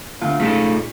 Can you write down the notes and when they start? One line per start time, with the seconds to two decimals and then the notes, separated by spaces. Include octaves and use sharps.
0.22 D2 F4
0.40 A#2 C#3 G#3 A3 D#4 A4 B6